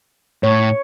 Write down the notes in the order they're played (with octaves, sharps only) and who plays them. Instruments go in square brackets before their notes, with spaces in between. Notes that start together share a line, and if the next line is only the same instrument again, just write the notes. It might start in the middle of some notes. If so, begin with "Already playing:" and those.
[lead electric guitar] A2 [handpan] C#5